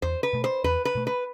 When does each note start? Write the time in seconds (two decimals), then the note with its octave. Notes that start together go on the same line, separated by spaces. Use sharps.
0.02 E2 C5
0.23 B4
0.33 B2 A3
0.44 C5
0.64 E2 B4
0.85 B4
0.95 B2 A3
1.07 B4